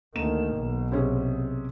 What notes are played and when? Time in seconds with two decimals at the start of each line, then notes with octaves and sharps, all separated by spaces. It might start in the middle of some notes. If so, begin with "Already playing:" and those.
0.15 D2 D#3 A#3 E7
0.57 B1
0.92 C3 C#4 G#4